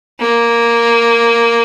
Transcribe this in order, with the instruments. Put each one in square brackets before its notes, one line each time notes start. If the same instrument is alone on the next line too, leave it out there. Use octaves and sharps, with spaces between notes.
[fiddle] A#3